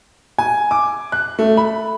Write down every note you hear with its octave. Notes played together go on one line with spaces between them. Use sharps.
G#5
D6
F#6
A3
B5